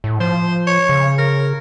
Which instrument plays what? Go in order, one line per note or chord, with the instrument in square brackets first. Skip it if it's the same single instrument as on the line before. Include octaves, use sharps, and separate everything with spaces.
[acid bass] A2
[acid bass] F3 [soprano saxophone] C5
[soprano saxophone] C#5
[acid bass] C#3
[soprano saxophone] A#4